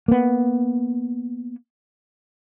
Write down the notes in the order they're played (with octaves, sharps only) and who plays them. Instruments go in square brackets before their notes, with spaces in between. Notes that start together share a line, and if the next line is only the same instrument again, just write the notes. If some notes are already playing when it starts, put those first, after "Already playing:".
[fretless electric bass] A#3 B3